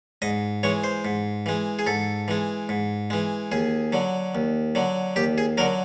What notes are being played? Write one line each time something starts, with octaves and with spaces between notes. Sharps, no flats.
G#2 D#5
E3 G#3 C#5
C5
G#2
E3 G#3
G#4
G#2 A4
E3 G#3
G#2
E3 G#3
D#2 G#4
D3 F#3
D#2
D3 F#3
D#2 G4
G#4
D3 F#3 A#4